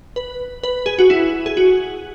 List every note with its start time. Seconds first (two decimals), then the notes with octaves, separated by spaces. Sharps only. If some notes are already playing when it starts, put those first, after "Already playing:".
0.16 B4
0.63 B4
0.86 G#4
0.99 F#4
1.10 E4
1.46 G#4
1.57 F#4